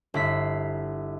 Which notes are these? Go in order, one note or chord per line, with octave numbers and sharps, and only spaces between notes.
G1 E4 B6 C7